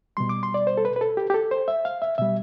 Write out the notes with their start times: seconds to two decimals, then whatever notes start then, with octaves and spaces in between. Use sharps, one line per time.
0.17 B2 G3 C6
0.29 D6
0.43 C6
0.54 D5
0.67 C5
0.78 A4
0.85 B4
0.96 B4
1.01 A4
1.17 G4
1.30 G4
1.34 A4
1.51 C5
1.68 E5
1.85 F5
2.02 E5
2.18 B2 G3 E5